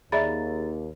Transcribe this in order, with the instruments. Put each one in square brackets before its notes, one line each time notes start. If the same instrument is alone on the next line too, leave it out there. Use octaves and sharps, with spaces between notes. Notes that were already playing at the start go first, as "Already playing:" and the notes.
[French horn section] D#2 [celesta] G#4 A#5 A6 [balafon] D5 E5 B5